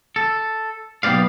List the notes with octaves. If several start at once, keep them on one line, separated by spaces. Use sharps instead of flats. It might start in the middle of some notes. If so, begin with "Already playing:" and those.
A4
B1 B3 G4 D5 F5